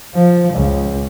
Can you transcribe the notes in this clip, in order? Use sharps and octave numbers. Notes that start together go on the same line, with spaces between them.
F3
C#2